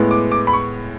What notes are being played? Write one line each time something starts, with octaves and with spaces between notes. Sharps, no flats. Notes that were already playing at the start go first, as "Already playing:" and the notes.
Already playing: A2 G#3 B3
D6
D6
B5
C#6